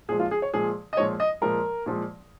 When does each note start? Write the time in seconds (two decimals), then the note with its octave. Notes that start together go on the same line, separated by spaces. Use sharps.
0.09 A#2 F3 G#3 G#4
0.20 F4
0.31 G#4
0.42 C#5
0.54 A#2 F3 G#3 G#4
0.93 D#5
0.97 A#2 F3 G#3 C#5
1.20 D#5
1.41 A#2 F3 G#3 A#4
1.86 A#2 F3 G#3